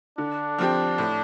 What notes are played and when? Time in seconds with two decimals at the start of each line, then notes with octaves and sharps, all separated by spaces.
0.18 D3 D4
0.58 F3 C4 G4
0.98 A2